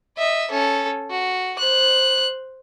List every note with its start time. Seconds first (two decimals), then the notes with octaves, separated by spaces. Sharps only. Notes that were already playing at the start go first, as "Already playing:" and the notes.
0.17 D#5 E5
0.50 C#4 A4
1.10 F#4
1.59 C5 F#6